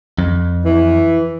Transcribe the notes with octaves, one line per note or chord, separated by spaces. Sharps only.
F2
E3